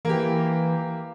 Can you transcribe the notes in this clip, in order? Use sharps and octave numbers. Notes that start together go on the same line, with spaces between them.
E3 A#3 G4